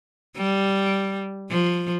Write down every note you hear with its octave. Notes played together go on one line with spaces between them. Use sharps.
G3
F3